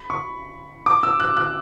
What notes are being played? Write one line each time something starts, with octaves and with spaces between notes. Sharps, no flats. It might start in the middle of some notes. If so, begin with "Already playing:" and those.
Already playing: B5
C#6
D6
E6
F#6
F#6